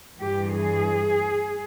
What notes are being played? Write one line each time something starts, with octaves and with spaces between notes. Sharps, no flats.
G2 E3 G4
G#4